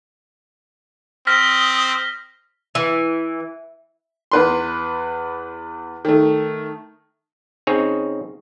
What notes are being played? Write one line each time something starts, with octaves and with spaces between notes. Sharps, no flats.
C4 D#6 F6 A#6 B6
E3
E2 B4 C6
D#3 A3
C#3 C4 D#4 G#4 C#5